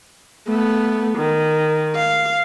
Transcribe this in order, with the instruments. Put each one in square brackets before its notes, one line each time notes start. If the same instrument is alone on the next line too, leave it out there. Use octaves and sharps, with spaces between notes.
[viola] A3 B3
D#3
F5